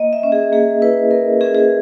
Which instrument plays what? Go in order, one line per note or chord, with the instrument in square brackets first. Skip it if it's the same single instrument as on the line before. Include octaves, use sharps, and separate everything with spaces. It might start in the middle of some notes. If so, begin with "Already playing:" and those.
Already playing: [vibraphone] A#3 D#5
E5
C#4
G#4
A#3 G#4
E4 B4
A#3 A#4
C#4 G#4
G#4